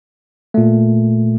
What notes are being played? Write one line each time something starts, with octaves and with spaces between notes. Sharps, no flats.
A#2 A3